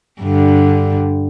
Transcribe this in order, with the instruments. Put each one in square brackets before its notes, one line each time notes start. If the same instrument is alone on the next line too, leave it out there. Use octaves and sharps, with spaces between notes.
[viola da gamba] G2 D3